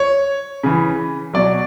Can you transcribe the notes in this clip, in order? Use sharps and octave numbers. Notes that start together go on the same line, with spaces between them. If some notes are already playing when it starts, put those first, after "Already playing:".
Already playing: C#5
C#3 E3
B2 F#3 D5